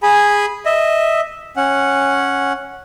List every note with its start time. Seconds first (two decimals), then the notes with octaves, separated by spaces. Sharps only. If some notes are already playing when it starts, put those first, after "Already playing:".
0.03 G#4 G#5 B5
0.66 D#5 E5
1.57 C#4 F#5